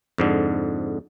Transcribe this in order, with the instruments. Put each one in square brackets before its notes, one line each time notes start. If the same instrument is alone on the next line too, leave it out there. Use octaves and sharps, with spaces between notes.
[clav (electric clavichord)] F2 G#2 D3